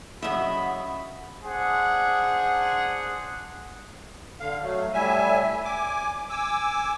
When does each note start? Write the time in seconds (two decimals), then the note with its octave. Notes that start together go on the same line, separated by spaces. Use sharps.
0.22 F#2 C#3 D#5 E5 F#5 B5
1.43 D4 G#4 C5 F#5
4.40 D3 F5
4.62 F#3 A3
4.93 A2 G3 E5 G#5
5.64 G#5 D6
6.30 G#5 D6 E6